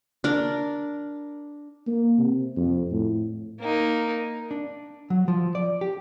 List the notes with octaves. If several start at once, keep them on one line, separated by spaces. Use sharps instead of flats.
D4 A#4
A#3
C3
F2
A2
A#3 D#4
D4
F#3
F3
D5
G4